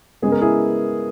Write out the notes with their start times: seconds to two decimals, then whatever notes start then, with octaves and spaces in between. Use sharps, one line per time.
0.22 C#3 G#3 B3 G#4
0.32 A#4
0.41 E4 G#4